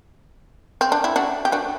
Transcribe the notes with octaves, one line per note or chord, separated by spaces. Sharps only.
C4
D4
E4
D4 F#4
G4
D4 F#4